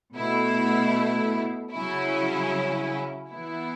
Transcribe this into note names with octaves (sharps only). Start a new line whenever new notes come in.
B2 A3 E4
C#3 F#3 C#4 E4
E3 B3 E4